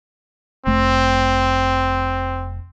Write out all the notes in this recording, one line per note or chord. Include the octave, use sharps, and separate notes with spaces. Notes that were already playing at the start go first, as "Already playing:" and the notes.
F1 A3 C4